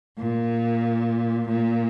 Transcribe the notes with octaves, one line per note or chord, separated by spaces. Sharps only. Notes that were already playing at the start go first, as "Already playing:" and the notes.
A#2
A#2